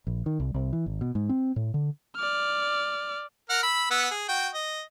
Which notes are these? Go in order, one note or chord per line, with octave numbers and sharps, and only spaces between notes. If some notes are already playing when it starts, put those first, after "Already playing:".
A#1
D#3
C2
C2
E3
G#1
B2
G#2
C4
A2
D3
D5 F6
A#4 F#5 F6
B5 E6
B3 F#5 E6
G#4
F#4 G5
D#5